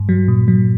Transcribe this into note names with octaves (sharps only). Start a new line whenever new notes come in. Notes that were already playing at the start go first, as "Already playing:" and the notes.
Already playing: G2
F#3
A#2
F#3